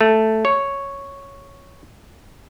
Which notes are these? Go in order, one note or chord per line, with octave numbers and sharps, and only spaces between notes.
A3
C#5